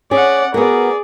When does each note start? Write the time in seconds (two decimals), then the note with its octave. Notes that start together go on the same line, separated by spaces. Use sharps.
0.11 C#4 G#4 D5 F#5
0.54 B3 F#4 G#4 A#4 D5